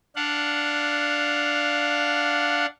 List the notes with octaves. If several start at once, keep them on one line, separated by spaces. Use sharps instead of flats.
D4 F5 F#5